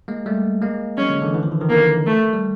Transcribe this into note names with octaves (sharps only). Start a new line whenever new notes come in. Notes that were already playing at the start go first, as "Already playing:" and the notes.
G#3 A#3
G3 A3
G#3 A#3
F#3 G#3 C#4
D3
D3 E3
D3 E3
D#3 F3
D3 E3
D#3 F3
D3 E3 A#3
A3
G3